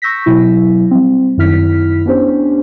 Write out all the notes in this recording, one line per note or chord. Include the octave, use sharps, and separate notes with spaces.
C#6 E6 G6 A#6 B6
B2 F#3 E4
G3 C4
F#2 D#3 E4 F6 B6
B3 C#4 D4 G4 C5